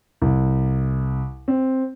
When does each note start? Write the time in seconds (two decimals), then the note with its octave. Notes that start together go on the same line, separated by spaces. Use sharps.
0.22 C2
1.48 C4